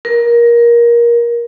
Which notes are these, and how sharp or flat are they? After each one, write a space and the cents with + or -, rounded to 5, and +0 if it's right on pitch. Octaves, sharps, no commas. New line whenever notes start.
A#4 +20